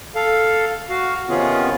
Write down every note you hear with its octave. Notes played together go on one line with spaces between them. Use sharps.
A4 F5
F#4 F5
C3 D#3 B3 C#4 F4 G#4